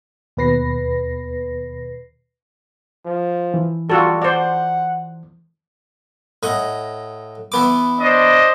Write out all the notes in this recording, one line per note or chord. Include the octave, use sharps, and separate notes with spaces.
D#2 B2 B4 A#6 C7
F3
E3
G3 F4 F#4 A4
C5 D5 F#5
A2 D#5 F#5
E3 B3 D6
D4 C5 D#5